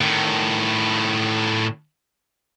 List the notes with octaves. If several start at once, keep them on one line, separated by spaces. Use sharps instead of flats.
A2 D#3